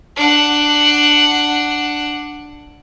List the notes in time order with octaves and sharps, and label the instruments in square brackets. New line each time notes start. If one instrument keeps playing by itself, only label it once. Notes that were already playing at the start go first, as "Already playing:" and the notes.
[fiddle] D4 F#5